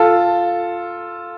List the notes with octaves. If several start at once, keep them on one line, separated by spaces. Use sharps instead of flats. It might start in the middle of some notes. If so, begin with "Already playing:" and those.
Already playing: F4 A4